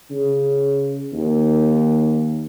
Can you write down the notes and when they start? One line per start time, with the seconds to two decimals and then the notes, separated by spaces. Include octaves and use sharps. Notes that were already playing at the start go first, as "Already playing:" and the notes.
0.11 C#3
1.13 D#2